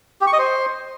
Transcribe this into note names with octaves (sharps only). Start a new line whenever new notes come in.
G4
C#6
D#5
C5